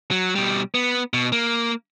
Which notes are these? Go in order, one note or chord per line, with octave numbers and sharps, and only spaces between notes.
F#3
B2 G3
B3
B2
A#3